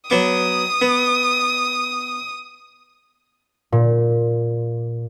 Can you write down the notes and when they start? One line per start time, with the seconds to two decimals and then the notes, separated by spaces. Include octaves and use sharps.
0.10 F#3 B3 D6 D#6
0.81 B3
3.72 A#2